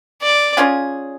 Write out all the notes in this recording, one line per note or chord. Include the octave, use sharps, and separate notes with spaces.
D5
C#4 F4 G#4